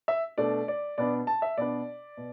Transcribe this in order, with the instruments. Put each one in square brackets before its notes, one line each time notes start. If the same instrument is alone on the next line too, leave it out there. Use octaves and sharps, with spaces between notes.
[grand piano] E5
B2 A3 D4 D5
D5
B2 B3 D4 D5
A5
E5
B2 B3 D4 D5
B2